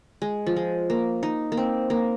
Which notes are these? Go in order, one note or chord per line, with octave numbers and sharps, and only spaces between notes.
G#3
F3
G#3
A#3
D#4
A#3
C4
A#3